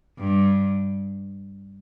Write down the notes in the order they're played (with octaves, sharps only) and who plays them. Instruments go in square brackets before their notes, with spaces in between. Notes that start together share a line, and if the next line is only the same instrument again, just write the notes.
[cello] G2